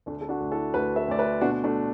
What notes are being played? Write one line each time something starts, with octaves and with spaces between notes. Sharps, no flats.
D2 A3 D4
A4
D4 F#4
D2
E4 A4
D2 F#4 B4
B4 E5
D2 D5
B4 E5
B2 D4 F#4
A3 D4